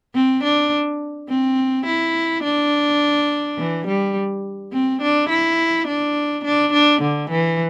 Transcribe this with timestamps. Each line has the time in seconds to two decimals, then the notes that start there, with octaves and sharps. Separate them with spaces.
0.15 C4
0.43 D4
1.29 C4
1.86 E4
2.43 D4
3.58 E3
3.87 G3
4.72 C4
5.02 D4
5.29 E4
5.87 D4
6.44 D4
6.73 D4
7.01 D3
7.30 E3